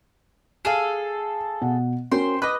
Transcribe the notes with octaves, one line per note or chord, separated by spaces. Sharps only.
G#4 A4 F5 E7
B2 F#5
C#4 F#4 A#4 C5 G5 C6
B4 D#5 D6 F#6